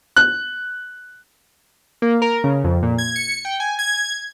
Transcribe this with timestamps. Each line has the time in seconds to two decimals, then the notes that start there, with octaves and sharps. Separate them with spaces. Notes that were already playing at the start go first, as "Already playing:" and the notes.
0.17 F#6
2.02 A#3
2.22 A#4
2.44 C#3
2.64 F2
2.83 A#2
2.98 G#6
3.16 C#7
3.45 G5
3.60 G#5
3.79 G#6